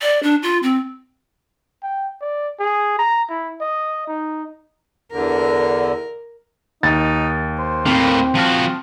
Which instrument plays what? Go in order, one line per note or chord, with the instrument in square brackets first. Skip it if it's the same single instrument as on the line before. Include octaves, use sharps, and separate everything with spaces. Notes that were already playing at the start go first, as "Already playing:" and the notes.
[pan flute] D5
D4
F4
C4
[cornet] G5
D5
G#4
A#5
E4
D#5
D#4
[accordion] E2 D3 [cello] A#4
[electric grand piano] D#2 [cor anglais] D#4 [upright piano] A6
[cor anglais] C5
[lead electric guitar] A2 A#3 [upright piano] C4
[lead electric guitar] F3 F#4 [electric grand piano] A5 C6 F6